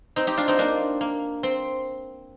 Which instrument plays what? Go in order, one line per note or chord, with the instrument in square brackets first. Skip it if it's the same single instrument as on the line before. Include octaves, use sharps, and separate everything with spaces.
[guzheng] C4 D#4
D#4 G4
D4 F4
C4 D#4
A#3 D4
A#3
C4